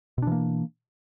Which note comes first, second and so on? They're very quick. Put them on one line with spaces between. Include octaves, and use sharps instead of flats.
B2 D4 E3 A#3